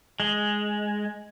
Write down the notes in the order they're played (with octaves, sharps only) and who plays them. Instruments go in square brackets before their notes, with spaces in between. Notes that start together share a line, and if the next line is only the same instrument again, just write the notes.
[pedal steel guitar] G#3